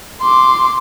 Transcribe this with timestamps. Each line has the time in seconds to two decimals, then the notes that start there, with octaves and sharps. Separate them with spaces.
0.21 C6 D6